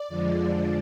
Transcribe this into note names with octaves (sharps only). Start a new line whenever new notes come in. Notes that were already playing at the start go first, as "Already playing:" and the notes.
Already playing: D5
F2 D3 F3 G#3